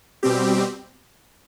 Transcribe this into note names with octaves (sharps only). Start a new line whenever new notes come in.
B2 G3 C4 G4